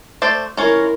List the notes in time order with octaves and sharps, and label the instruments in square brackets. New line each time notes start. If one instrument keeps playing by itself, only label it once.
[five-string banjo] A3 C5 D5
[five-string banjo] C#4 F4 C#5 [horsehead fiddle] E4 A#4